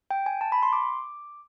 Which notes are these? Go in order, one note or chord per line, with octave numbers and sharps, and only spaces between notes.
G5
G#5
A5
B5
C6
D6